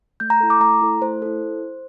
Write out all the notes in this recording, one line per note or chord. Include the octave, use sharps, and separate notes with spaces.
A3 G6
A#5
E4 A4
D6
A3 A#5
E4 A4
A3 C5
E4 A4